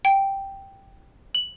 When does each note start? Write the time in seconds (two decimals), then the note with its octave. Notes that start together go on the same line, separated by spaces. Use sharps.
0.05 G5
1.35 F#7